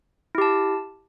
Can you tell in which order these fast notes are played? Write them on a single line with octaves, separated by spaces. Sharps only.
E4 G4 A5